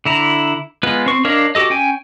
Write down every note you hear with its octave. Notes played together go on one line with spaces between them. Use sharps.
D3 E4 A#5
G#3 B3 F4 B4
C4 C#6
D4 A#4 C#5 D#5 F5
F#4 G4 A4 D#5
C#4 G5 G#5